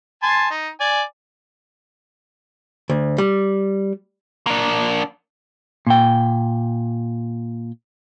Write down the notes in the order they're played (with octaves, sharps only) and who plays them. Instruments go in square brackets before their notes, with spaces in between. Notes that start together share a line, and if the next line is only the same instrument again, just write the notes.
[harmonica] G#5 A5 C6
D#4
D5 G#5
[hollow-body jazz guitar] D2
G3
[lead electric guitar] A#3 D4
[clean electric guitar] A#2 G5